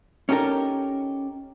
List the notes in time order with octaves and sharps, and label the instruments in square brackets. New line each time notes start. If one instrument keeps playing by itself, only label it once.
[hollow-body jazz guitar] C#4 D#4 G4 A4 A#4